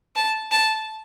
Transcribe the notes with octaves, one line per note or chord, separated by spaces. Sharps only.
A5
A5